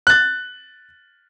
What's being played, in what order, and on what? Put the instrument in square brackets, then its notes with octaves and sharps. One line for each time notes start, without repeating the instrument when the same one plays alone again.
[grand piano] F#6 A6